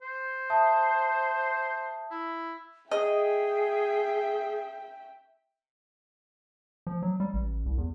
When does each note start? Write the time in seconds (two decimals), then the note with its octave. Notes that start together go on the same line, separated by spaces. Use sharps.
0.02 C5
0.50 E5 A5 D#6
2.11 E4
2.91 G#4 D#5 E5 G5
6.87 F3
7.03 F#3
7.20 G3
7.34 A1
7.66 C2
7.78 E2